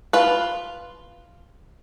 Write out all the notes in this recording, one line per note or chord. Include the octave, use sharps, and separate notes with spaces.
F4 B4